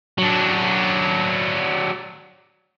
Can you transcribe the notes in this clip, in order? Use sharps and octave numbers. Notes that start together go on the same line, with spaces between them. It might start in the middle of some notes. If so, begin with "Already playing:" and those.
F#3 D4